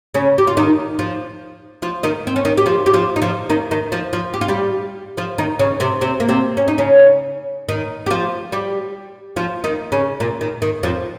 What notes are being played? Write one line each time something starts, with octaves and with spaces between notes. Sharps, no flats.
C#3 C#4
G4
F4
D#3 D#4
F3 F4
F3 F4
D#3 D#4
C4
C#4
D#3 D#4
G4
F3 F4
G4
F3 F4
D#4
F3 F4
D#3 D#4
D#3 D#4
F3 F4
F3 F4
G4
F4
G3 G4
F3 F4
D#3 D#4
C#3 C#4
C3 C4
C3 C4
A#3
C3 C4
C#4
D#4
C#3 C#4
D#3 D#4
G4
F3 F4
G3 G4
F3 F4
D#3 D#4
C#3 C#4
A#2 A#3
D#3
D#3
F2 F3